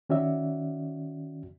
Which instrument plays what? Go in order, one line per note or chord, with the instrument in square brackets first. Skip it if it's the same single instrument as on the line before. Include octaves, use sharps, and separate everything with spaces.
[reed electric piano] D#3 C#4 F#4 D5 E5